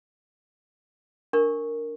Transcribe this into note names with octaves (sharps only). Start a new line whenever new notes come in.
D4 A#4 C#6